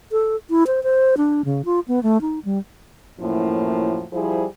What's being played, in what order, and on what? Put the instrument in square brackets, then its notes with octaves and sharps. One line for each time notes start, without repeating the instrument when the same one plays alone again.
[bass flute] A4
E4
C5
C5
D4
C#3
F4
B3
A3
D#4
G3
[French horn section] F#2 A2 F3 F#3 A#3 E4
F3 G3 E4 G#4 C5